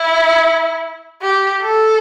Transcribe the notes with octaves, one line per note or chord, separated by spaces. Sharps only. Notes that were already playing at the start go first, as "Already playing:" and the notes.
Already playing: E4
G4
A4